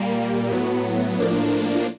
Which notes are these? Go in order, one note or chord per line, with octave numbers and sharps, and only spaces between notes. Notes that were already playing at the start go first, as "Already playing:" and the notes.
Already playing: A#2 G3 A#3
A2 F#3 B3
A2 F3 A#3 D4